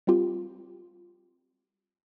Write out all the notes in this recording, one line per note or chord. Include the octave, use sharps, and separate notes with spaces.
G3 C4 F4 G4